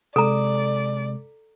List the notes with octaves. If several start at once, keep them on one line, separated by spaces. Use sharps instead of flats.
C3 G#3 A4 D5 A#5